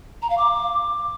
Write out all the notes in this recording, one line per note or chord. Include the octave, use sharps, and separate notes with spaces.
A#5
F5
D6